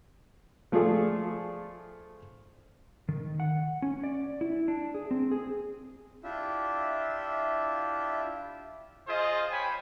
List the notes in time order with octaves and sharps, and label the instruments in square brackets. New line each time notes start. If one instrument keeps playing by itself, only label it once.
[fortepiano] F3 A3 F4 G#4 D5
[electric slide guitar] D#3
F#5
C#4
D5
E4
D4
G#4
C4
G#4
[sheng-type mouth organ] D4 E4 F4 G4 E5
[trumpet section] F4 G#4 C5 D#5
C#5 G5 G#5 B5